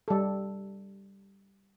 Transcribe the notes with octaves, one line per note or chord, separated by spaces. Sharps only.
G3 A4